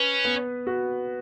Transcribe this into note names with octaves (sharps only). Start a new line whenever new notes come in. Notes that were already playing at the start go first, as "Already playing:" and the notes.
Already playing: C#4 B4
B3
F#4